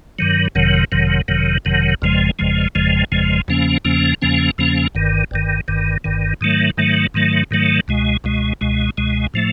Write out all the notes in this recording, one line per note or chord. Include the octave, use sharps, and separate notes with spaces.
G2 D#3 F#3
F#1 F2 C3 D#3 F#3
F#1 F2 C3 D#3 F#3
F#1 F2 C3 D#3 F#3
F#1 F2 C3 D#3 F#3
G1 F2 C#3 F3 G#3
G1 F2 C#3 F3 G#3
G1 F2 C#3 F3 G#3
G1 F2 C#3 F3 G#3
E2 C#3 F3 A#3 C#4
E2 C#3 F3 A#3 C#4
E2 C#3 F3 A#3 C#4
E2 C#3 F3 A#3 C#4
G1 G2 D#3
G1 G2 D#3
G1 G2 D#3
G1 G2 D#3
G#2 D#3 F#3 A3
G#2 D#3 F#3 A3
G#2 D#3 F#3 A3
G#2 D#3 F#3 A3
C#2 B2 G#3
C#2 B2 G#3
C#2 B2 G#3
C#2 B2 G#3
A2 F3 A3